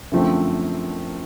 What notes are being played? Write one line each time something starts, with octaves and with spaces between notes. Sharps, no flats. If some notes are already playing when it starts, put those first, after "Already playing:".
F#2 D3 F3 A3 C4